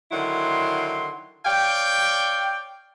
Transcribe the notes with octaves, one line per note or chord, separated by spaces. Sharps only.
D3 D#3 F#3 E4 C6
C#5 D5 F5 G5